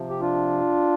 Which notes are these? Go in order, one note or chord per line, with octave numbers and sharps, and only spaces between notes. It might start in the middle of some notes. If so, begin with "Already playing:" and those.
Already playing: C3 F3
G4
D4 F4